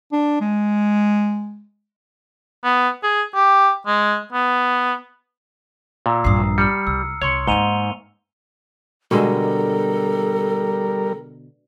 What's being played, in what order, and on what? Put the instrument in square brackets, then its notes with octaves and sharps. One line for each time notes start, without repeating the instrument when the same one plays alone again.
[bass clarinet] D4
G#3
[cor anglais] B3
G#4
G4
G#3
B3
[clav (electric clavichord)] A#2 [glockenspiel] A#5 E6
[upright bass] A#1 G2 [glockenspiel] D#6 C7
[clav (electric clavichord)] G3 [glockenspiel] F6 C#7
[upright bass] C2 [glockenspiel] E6
[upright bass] C2 [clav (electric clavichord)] C#5 [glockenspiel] C6 C#6 C#7
[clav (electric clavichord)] G#2 [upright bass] A#3 B3 [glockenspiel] D#7 F7 G7
[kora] B2 D3 G#3 [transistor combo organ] G3 A#4 [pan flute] A4